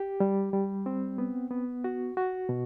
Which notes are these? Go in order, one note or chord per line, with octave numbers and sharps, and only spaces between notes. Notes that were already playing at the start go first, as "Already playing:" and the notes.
Already playing: G4
G3
G3
C4
B3
B3
F#4
F#4
B2